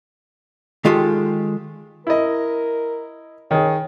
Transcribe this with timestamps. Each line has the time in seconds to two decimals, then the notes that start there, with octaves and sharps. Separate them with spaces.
0.85 D#3 G#3 F4 G4 A4
2.07 E4 A#4 D#5
3.51 D#3 G#4 C#5